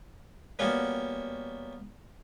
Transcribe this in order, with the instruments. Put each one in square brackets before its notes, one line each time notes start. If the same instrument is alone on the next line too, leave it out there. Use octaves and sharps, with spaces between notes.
[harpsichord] G3 A#3 B3 C#4 F4 F#4